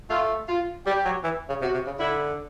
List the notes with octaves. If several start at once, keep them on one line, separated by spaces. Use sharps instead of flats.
A3 F4
F4
G3 G4
F#3
E3
C#3
C3 F#4
C3
C#3
D3 E4